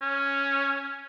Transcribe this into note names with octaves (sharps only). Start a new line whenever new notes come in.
C#4